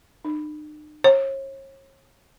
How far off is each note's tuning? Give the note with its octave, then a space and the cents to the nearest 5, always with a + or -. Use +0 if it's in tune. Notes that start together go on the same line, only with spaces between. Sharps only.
D#4 -45
C#5 -35